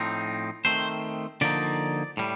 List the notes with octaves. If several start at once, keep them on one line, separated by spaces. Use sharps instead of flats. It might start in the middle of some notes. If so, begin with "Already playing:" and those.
Already playing: A2 F3 C4 D#4
D#3 A3 C4 C5
D3 F3 A#3 D#4 D5
A2 G3